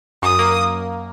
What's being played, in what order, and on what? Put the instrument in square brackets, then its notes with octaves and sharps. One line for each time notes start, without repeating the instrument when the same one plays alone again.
[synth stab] F#2 [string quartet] D#6
[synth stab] A#3